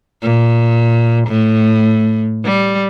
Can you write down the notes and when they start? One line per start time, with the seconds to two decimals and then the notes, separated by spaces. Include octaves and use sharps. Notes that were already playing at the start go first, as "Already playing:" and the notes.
0.23 A#2
1.28 A2
2.45 G3